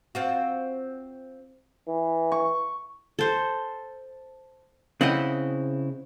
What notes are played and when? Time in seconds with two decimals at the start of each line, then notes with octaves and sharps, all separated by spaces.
0.15 C4 F4 F#4
1.88 E3
2.32 C#6
3.19 A4 C5
5.01 C#3 C4 E4 D#5 F#5